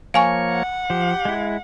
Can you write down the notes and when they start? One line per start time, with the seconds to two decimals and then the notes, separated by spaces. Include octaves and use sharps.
0.14 F3 A#3 C#5 F5 G#5 C#6
0.52 F#5
0.90 F3 G4
1.25 G#3 E4